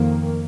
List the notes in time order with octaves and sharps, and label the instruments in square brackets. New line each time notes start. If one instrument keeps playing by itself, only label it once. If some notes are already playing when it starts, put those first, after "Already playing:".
Already playing: [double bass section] F2 D#3 A#3